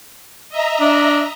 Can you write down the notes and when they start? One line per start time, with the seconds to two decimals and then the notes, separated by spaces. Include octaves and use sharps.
0.49 D#5 E5 A#5
0.80 D4